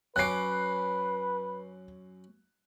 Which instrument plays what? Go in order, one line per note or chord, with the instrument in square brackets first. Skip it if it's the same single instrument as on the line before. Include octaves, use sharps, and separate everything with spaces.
[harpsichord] F#2 C#4 D6 [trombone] B4 [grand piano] F#6 C7